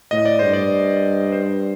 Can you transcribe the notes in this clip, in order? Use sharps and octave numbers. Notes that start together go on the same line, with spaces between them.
A2 D#5
D5
G2 C5
D5
C5